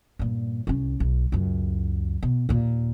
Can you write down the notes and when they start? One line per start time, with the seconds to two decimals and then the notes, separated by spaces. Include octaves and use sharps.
0.19 G2 A#2
0.67 C2 C#4
1.00 B1
1.32 C#2 F#2
2.23 B2
2.49 D#2 A#2